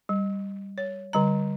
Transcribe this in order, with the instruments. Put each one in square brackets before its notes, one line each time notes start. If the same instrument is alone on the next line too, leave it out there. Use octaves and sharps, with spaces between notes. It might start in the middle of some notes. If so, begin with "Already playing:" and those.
[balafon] G3
C#5
D3 G3 A#5